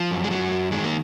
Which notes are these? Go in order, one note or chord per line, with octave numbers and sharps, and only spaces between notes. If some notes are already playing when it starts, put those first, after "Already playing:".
Already playing: F3
F#2
G#3
F#2 F#3
F#2
D#3 G#3
A#3